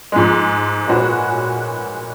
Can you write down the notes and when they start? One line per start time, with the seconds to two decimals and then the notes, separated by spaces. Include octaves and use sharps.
0.12 G#2 F3 G#3
0.86 A#2 G#3 C#4 F#4 B4